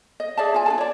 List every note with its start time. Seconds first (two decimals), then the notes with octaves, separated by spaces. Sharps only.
0.20 D#5
0.37 G#4 D5 E5 A5
0.54 F4 G#5
0.66 D4 G#4 A5
0.78 C#5 D5